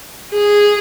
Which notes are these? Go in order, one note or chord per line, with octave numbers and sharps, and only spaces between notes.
G#4